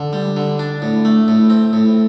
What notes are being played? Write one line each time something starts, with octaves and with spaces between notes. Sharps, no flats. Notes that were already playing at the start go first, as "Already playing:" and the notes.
Already playing: D3
G3
D3
D4
A2
A3
A2
C4
A2